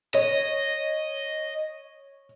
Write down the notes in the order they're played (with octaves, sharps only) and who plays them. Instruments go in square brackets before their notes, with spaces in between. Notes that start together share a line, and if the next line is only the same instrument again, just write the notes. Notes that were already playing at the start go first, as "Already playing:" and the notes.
[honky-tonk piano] C#5 [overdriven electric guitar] D#5